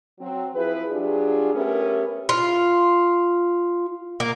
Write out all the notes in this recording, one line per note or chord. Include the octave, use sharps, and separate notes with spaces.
F#3 C4
F3 E4 G#4 B4
F#3 D4 F4 G4 G#4
A3 B3 C#4 G4 A4 A#4
F4
A#3